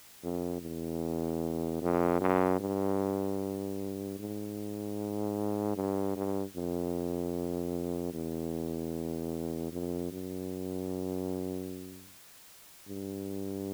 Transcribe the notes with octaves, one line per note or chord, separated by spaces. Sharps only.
F2
E2
F2
F#2
G2
G#2
G2
G2
F2
E2
F2
F#2
G2